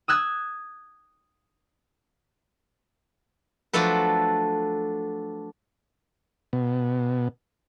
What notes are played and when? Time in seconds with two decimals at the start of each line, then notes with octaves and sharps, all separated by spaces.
0.08 D#6 E6 F#6 G#6
3.73 F3 F#3 A3 D4 A4 B4
6.53 B2